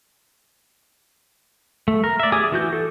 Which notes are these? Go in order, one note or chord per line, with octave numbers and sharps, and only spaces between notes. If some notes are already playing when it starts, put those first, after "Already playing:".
A3
A#4
D5 E5
G4 G#4 G#5 D6 D#6
E3 F#4 G6
A4